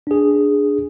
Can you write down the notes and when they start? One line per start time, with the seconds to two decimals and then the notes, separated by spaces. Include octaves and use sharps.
0.07 D4 G#4